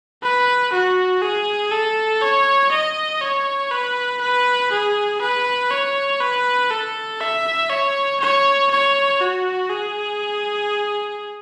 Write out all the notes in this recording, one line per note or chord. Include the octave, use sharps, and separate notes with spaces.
B4
F#4
G#4
A4
C#5
D#5
C#5
B4
B4
G#4
B4
C#5
B4
A4
E5
C#5
C#5
C#5
F#4
G#4